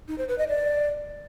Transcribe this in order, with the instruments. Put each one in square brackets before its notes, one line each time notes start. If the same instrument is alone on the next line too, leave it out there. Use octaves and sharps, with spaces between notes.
[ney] D#4
C5
B4
D#5
D5